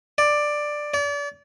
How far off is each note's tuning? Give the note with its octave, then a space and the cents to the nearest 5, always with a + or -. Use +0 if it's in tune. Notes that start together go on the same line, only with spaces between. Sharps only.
D5 +10
D5 -35